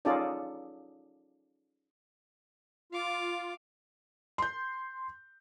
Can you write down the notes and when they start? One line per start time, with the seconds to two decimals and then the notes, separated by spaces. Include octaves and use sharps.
0.05 C#4 D#4 F4 G#4 A4 D5
2.93 F4 F5 D6
4.38 C6 G6